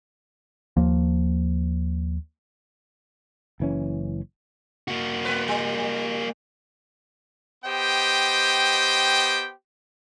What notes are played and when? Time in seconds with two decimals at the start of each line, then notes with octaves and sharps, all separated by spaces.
0.77 D#2 F3 A#3
3.60 F#1 E3 C#4
4.88 A#3 F#4
5.25 B3 B4
5.48 G3
7.64 B3 G4 C5 D#5 G5